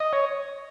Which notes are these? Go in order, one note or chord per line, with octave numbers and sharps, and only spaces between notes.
D#5
C#5